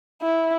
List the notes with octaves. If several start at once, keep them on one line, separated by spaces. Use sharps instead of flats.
E4